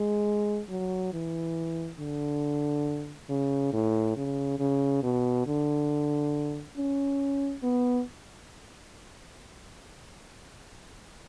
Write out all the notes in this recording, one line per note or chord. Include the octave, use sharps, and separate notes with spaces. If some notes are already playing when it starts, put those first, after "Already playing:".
Already playing: G#3
F#3
E3
D3
C#3
A2
C#3
C#3
B2
D3
C#4
B3